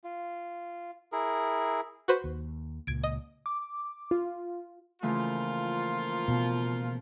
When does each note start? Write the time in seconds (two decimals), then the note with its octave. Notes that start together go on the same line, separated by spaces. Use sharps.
0.04 F4
1.12 E4 G#4 A#4
2.08 F#4 B4 C5
2.24 D#2
2.87 C#2 A#2 G#6 D7
3.04 D#5
3.46 D6
4.11 F4
5.02 C#3 E3 F3 A3 A#3 F4
6.28 B2